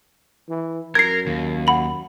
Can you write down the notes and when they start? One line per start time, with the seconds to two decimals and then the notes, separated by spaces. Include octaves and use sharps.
0.49 E3
0.95 F#2 A#4 G#6 C7
1.27 D#2
1.67 F#5 B5 F#7